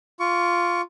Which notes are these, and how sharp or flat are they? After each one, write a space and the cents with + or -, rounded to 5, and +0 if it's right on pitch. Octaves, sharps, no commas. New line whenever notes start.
F4 +0 C#6 +20